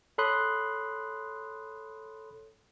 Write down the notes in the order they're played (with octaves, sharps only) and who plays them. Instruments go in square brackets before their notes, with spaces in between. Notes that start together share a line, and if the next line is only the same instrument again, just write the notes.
[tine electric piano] A4 C#5 B5 C6 D#6 F#6